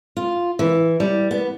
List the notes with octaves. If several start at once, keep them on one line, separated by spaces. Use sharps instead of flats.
F4
E3
G3
B3